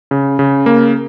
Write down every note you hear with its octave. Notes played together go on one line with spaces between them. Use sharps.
C#3
C#3
A#3